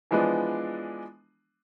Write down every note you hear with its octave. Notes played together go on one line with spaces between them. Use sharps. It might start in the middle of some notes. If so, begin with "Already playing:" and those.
E3 F3 G#3 B3 D4